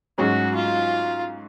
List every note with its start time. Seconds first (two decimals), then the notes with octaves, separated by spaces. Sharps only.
0.18 G#2 F#3 C#4 F#4 G#4
0.55 F4